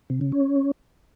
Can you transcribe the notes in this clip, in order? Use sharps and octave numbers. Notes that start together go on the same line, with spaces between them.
C3
C#3
C#4